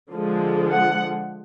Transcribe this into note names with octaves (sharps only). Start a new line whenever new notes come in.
D3 F3 G#3
F#5